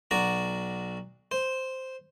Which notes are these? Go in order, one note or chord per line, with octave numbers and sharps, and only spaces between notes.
B1 F#4 D5 A#5
C5